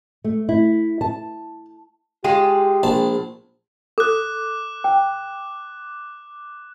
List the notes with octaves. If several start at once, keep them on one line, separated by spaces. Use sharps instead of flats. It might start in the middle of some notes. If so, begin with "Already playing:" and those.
A3
E4
A5
G#3 F4 G4 G#4 G5
A#1 A5
A4 D6 F#6
G5